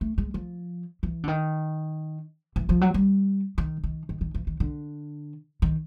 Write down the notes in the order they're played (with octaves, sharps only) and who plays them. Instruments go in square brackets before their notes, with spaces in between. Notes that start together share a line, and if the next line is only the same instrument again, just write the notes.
[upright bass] A3
G#3
F3
E3
D3
D#3
E3
F3
F#3
G3
D#3
D#3
D#3
D#3
E3
D#3
D3
D#3